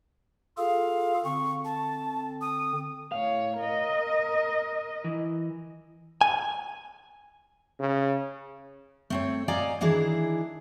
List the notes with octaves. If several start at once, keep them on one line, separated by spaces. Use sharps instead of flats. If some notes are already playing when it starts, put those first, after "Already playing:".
F4 G#4 A4 F5
D3 C4 C#6
A5
D#6
A2 C#5 F5
A#4 D#5
E3
G#5
C#3
A3 C4 C#5
D5 D#5 F5 G#5 A#5
D#3 E3 D4 E4 G#4